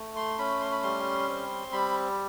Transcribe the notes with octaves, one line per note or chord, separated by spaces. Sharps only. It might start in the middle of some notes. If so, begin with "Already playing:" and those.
Already playing: A3
C6
C#4 B5
C6
B5
G3 C6
C4
G3 B5